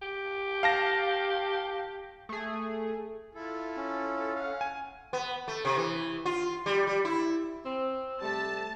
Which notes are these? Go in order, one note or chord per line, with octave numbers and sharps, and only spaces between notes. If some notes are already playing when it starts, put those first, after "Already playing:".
G4
F5 A5 A#6
A3 G#4
E4 F4 A4
C#4
F5 F#5
G#5
B3
A3
C3
E3
F4
G3
G3
E4
C4
C3 G3 A3 A5